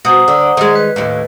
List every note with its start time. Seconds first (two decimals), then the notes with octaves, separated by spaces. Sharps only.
0.05 B2 C5 F#5 A#5 D#6 F#7
0.28 D3
0.57 D#3 G#3
0.75 B4 F#6
0.96 D#2 A2